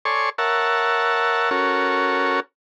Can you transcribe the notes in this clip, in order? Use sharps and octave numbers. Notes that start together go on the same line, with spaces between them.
A4 C#5 D5 G#5 C6 C#6
A#4 C#5 E5 F#5 A5
C#4 F#4 A4 A#4 C#5